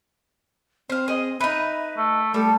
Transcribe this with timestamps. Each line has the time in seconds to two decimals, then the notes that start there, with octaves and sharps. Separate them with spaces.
0.90 C4 C5 F5
1.08 G#4 D#5
1.41 D#4 B4 E5
1.97 A3
2.34 G3 A3 A4